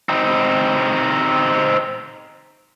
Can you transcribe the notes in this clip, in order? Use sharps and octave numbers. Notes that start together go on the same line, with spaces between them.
C4 D#4